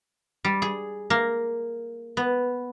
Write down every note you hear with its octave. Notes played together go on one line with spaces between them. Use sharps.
G3
G#4
A#3
B3